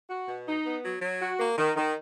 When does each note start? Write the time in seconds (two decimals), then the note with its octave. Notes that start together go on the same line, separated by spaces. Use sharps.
0.10 F#4
0.28 B2
0.47 D#4
0.65 B3
0.83 F#3
1.01 F#3
1.20 F#4
1.39 A#3
1.58 D#3
1.76 D#3